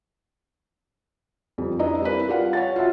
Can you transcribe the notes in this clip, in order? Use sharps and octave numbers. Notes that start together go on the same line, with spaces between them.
F2 G3
D4 E4 B4 D5 D#5 A#5
G3 C4 E4 A#4 B4 D5
F4 G4 D5 F5 F#5
C#5 F#5 A6
F4 F#4 E5 F#5